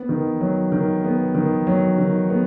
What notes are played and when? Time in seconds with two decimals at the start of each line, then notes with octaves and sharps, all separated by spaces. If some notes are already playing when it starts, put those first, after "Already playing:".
Already playing: B3
0.09 D#3
0.41 F#3
0.72 D#3
1.04 B3
1.35 D#3
1.67 F#3
1.98 D#3
2.30 B3